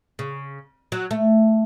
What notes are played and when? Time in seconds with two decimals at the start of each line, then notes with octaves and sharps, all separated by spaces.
0.19 C#3
0.92 F#3
1.11 A3